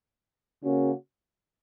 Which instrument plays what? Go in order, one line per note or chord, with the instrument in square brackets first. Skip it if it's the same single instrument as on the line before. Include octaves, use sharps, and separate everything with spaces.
[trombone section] C#3 A#3 C#4 F#4